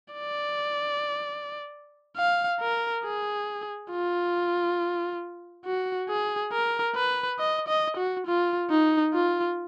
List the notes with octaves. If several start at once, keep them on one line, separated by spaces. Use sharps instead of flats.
D5
F5
A#4
G#4
F4
F#4
G#4
A#4
B4
D#5
D#5
F#4
F4
D#4
F4